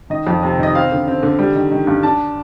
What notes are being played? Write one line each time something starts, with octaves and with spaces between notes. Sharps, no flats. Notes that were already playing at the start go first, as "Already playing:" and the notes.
D#3 D#5
F2
C3
D#3 D#5
C4 F5
D3
C4
D3
G3
D#3
D#3
G2
D4 A5